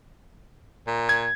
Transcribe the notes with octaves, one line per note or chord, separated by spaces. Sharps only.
A#2
G#6